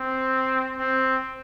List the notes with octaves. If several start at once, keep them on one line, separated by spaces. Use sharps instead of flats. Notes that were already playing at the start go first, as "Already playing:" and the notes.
Already playing: C4
C4